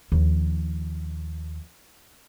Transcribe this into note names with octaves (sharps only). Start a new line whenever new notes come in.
D#2 F3